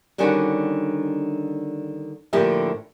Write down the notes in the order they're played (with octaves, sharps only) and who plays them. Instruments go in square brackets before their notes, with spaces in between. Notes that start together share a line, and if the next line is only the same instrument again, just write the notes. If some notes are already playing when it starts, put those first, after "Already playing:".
[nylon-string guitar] D3 D#3 G3 C#4 D4 F#4
A2 D3 F3 A#3 G4 E5